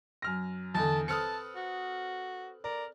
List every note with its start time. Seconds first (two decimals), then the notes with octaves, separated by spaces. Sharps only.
0.22 F#2 F6 A#6
0.75 E2 D3 D#4 A5
1.08 C4 A4 B4 A5 D#6 F6 C#7
1.56 F#4
2.64 A#4 D5